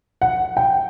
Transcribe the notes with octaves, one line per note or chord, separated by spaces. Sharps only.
F#5
G5